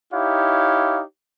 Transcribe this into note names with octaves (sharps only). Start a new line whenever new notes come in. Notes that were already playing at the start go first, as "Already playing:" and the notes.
D#4 E4 G4 C#5 F5